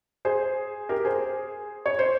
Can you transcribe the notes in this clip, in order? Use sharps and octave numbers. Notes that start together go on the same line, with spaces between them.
G#4 C5
G4 A#4
G#4 C5
C#5
C5